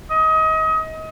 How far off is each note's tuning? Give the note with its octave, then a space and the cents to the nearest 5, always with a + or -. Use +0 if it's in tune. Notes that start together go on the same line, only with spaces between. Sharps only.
D#5 +30